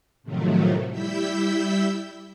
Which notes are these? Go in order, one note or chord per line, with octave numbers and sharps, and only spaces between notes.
A2 C3 D#3 F3 F#3 A3
G3 E4 E6 G6 B6